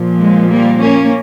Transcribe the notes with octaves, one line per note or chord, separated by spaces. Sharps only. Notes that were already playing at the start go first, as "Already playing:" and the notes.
Already playing: A#2 F3
G#3
G3 A#3
A#3 C#4